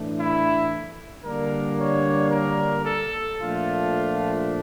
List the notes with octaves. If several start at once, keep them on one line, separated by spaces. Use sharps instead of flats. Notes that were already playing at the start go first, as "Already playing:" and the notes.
Already playing: A2 E3 A3 D4
E4
D3 G3 A#3 D4 A#4
C#5
A#4
A4
A#2 F3 A3 D4 F4